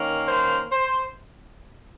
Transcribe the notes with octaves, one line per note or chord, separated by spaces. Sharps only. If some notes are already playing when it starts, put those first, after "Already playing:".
Already playing: D#3 A#3 C#4
C5
C5